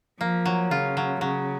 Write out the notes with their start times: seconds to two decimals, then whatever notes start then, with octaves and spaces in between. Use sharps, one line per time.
0.21 F3 A#3
0.46 F#3
0.71 C#3 F4
0.97 F#3
1.21 C#3 F#3